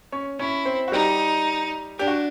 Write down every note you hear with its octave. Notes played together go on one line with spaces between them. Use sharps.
C#4 C#5
C#4 E4 C#5
C4 C5
F#4
G3 D#4 G4
D4 G4
F#4